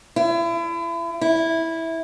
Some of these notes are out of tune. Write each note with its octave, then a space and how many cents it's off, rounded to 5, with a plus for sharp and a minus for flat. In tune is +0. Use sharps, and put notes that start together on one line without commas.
E4 +35
E4 -10